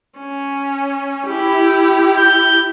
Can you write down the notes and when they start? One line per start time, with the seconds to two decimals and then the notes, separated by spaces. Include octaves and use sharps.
0.19 C#4
1.26 E4 G4
2.18 G6